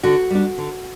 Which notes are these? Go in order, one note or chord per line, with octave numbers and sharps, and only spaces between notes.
D3 F#4
G3 D4
D3